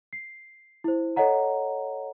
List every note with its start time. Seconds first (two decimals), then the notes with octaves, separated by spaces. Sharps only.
0.13 C7
0.84 E4 C5
1.16 A4 C#5 D#5 F#5 A#5